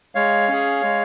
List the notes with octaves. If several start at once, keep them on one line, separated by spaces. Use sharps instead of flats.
G#3 C#5 F5
C#4 G#4
G#3